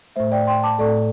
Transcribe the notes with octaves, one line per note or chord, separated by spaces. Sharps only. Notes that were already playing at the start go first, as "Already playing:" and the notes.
A2 A3 C5 E5
D5 G5
G5 C6
A5 D6
A2 A3 A4 D5